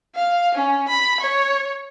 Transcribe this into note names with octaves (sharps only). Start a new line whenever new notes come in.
F5
C#4
B5
C#5